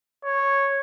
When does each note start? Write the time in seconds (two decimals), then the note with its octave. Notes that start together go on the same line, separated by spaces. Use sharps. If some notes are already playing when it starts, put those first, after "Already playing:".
0.24 C#5